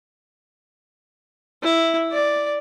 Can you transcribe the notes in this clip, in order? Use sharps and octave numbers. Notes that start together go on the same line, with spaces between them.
E4
D5